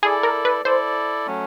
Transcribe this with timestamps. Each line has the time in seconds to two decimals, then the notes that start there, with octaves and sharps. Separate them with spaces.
0.03 E4 G#4 A4 D5
0.23 A#4
0.45 B4
0.65 E4 A4 C5 D5
1.27 F#3 A3 C#4